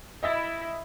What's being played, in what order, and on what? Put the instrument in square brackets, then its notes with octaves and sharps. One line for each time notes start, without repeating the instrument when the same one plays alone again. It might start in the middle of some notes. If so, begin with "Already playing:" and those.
[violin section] E4 [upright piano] D#5 E5 A6